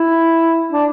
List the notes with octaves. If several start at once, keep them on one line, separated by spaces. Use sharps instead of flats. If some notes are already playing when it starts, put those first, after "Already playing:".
Already playing: E4
D4